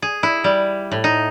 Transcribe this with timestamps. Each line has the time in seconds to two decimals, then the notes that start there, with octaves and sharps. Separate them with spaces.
0.02 G#4
0.23 E4
0.44 G3
0.92 A2
1.04 D#4